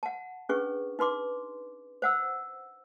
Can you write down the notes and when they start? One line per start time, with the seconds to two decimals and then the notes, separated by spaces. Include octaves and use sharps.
0.03 F#5 A5
0.49 C#4 D4 G#4 B4 C#6
0.99 D#4 B4 C6 D6
2.02 C5 F#5 E6